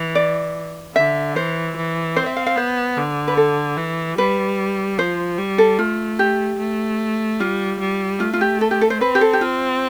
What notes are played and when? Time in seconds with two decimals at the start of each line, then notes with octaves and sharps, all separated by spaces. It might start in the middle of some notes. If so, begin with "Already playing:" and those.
Already playing: E3
0.15 D5
0.95 D3 E5
1.36 E3 C5
1.76 E3
2.16 C4 C5
2.26 E5
2.36 F5
2.47 F5
2.56 B3 C5
2.97 D3
3.28 B4
3.37 A4
3.77 E3
4.18 G3 B4
4.98 F3 C5
5.38 G3
5.58 A4
5.79 A3 F4
6.19 G4
6.59 A3
7.40 G3 F4
7.80 G3
8.20 A3 F4
8.33 F4
8.41 G4
8.61 A4
8.71 G4
8.81 A4
8.90 C5
9.01 C4 B4
9.15 G4
9.21 A4
9.33 G4
9.41 C4 F4